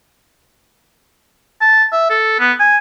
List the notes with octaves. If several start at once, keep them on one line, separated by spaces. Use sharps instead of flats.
A5
E5
A4
B3
G#5